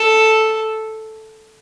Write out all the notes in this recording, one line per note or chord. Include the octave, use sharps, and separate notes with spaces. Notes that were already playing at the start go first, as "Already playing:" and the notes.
Already playing: A4